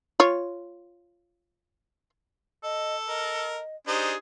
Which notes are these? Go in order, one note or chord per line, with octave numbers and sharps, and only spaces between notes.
F4 C#5
A4 D#5
A#4 D#5
D4 D#4 G4 G#4 C5